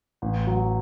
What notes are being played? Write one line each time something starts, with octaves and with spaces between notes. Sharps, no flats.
A1
F#3